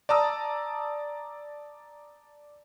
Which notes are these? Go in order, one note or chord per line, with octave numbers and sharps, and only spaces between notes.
D5 A5 A#5 D#6 E6